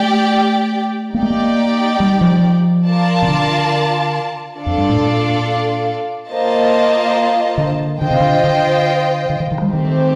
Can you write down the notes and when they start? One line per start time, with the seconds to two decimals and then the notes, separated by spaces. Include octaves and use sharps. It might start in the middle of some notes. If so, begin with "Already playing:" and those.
Already playing: A3 G4 D5 G5
1.14 A#3 D#4 G4 D5 G5
1.23 A3
1.30 A#3
2.00 G3
2.21 F3
2.86 F4 A#4 D5 A5
3.22 C3
3.28 D3
4.57 D4 F4 A4 D5 F5
4.66 F2
4.77 G2
4.89 A2
5.01 A#2
6.29 A#3 F4 C5 D#5 A5
7.58 D3
8.01 D3 F4 C5 D#5 G5
8.11 C3
8.20 D3
8.44 D3
9.30 D3
9.40 D#3
9.52 D#3
9.62 G3
9.72 D#3 A3 C4 G4 C5